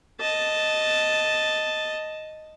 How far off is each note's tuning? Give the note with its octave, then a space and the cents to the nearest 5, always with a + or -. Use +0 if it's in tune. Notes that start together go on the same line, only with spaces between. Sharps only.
D#5 +0 A5 +0